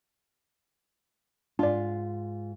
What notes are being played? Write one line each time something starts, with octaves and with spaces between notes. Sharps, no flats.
G#2 D4 F4 D5